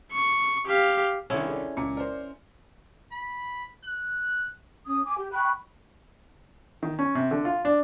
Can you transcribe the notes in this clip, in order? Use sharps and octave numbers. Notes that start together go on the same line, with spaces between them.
C#6
G4 F5
C2 D3 D#3 C#4 E4
G#4 A4 D5
C#2 A#2 A#5 C#7
A#4 C5 D5
B5
F#6
C#4 D#6
G#5 D6
G4
G5 B5 C#6 F#6
D#3
C#4
C3
D3
F4
D4